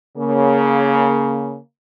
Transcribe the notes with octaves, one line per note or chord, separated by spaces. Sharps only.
C#3 A#3